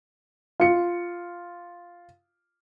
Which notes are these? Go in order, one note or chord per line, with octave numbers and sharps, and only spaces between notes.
F4 C#7